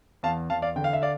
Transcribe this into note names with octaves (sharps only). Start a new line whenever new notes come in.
E2 F5 A5
E2 F5 A5
D5 F5
D3 G5
F5
E5
D5 F5